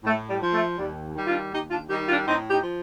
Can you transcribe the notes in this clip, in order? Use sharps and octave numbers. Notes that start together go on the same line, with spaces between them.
A2 A3
G3
F3
A3
D#2 G3
D#3 G3
D4 F4
D#2 D#4 G4
D4 F4
D#3 G3 D#4 G4
D4 F4
A2 C4 D#4
D#4 G4
F3